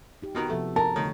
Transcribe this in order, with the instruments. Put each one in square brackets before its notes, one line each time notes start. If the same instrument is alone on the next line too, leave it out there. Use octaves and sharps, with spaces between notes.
[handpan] D#4 G4
[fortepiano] B2 D#3 A#4 [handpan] B3 F#4
[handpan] C3 F3 A4 [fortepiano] A3
[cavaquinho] A#4 [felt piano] A5
[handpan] D3 A3 C#5 [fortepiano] D#3